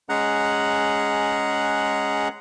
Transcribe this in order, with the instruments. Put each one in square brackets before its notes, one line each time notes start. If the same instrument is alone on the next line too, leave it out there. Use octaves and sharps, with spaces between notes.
[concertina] G#3 C#4 G#4 F#5 A#5 F#6